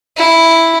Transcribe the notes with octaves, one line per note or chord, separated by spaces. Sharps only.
E4